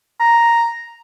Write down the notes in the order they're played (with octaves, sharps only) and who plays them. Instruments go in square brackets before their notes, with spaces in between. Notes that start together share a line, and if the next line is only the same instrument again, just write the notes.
[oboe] A#5